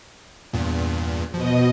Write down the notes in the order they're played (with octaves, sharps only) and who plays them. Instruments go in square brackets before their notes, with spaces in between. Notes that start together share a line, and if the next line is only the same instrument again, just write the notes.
[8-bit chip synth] E2 G2 A#2
[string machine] B2 D#5 [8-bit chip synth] F3